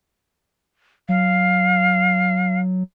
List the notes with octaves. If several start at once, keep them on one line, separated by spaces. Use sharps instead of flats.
F#3 F5